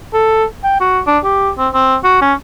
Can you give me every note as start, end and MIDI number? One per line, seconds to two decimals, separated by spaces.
0.14 0.44 69
0.64 0.80 79
0.81 1.00 66
1.07 1.18 62
1.24 1.50 67
1.58 1.69 60
1.74 1.96 60
2.04 2.21 66
2.22 2.33 61